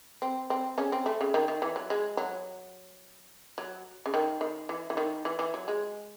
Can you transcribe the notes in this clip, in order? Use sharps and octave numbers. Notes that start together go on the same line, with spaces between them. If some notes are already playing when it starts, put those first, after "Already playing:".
C4
C4
C#3 C#4
C4
A3
C#3
D#3
D#3
E3
F#3
G#3
F#3
F#3
C#3
D#3
D#3
E3
E3
D#3
E3
E3
F#3
G#3